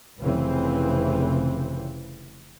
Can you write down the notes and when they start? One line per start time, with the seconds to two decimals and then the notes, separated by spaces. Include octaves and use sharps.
0.20 F1 C#3 E3 C4